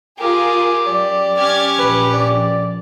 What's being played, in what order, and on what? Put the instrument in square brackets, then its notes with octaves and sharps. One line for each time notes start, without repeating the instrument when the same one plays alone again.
[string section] F4 G#4 A#4 [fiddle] G4
[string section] F#2 [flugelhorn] D5
[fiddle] C#4 G4 [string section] F6 G#6
[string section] A#1 [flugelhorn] B4
[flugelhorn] D5